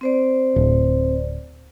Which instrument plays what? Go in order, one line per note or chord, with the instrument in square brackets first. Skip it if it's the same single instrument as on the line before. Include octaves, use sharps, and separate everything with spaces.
[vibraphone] C4 C5 D5
[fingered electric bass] D1